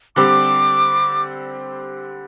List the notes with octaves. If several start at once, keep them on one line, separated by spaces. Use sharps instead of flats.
D3 G3 C4 G4 D6